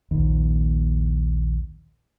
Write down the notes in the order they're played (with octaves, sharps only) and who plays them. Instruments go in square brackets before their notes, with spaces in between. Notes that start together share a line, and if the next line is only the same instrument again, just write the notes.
[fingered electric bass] A#1 D#2